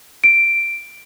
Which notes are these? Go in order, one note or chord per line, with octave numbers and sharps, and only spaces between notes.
D7